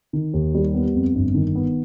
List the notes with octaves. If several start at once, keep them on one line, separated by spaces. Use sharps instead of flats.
D#3
D#2
G3
B3
F2
G1
D#3
B3